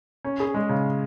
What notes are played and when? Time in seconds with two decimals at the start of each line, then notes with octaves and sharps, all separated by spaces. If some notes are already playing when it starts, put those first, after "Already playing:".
0.24 C#4
0.40 G#4
0.54 G#3
0.69 C#3